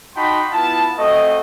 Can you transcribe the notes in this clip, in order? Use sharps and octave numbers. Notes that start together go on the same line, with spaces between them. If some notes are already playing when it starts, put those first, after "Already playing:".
D#4 F#4 G5 A5 B5 C6
B3 E4 F4 A5
A3 C4 F#4 D#5